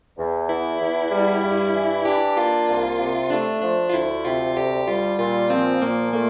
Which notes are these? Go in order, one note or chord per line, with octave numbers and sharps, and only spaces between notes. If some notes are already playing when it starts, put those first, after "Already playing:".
E2
E3 E4
E2
G3
G2
E3
D4 G4
A#3 F4
C2
C3
A3 D4
F3 D4
F4
D2 E4
C3 F4
D2 G4
G3 F4
A#2 F4
F3 C4
A#2 A#3
A3 A#3